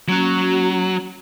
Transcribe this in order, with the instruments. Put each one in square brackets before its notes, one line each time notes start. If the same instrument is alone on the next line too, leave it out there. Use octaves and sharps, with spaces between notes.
[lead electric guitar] F#3 [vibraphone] A#3 C#4 F#4